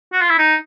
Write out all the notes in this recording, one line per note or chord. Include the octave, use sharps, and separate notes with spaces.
F#4
F4
E4
D#4